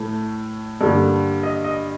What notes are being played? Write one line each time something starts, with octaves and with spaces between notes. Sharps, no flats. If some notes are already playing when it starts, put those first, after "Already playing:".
Already playing: A2 A3
G2 D3 G3 A#3
D#5
D#5